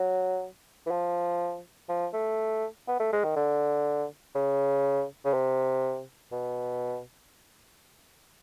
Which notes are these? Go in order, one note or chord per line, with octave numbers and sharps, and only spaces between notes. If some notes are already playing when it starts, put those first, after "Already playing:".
Already playing: F#3
E3
F3
F3
A3
B3
A3
G#3
D#3
D3
C#3
C#3
C3
B2